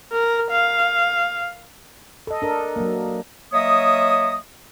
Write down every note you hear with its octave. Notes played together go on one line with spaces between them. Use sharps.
A#4
F5
A4 D#5
D4 A4 A#4
F#3 A#3
F#3 A#3 C#5 D#5 E5 D#6